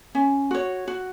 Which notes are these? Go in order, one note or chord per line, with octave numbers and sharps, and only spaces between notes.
C#4
F#4 C#5
F#4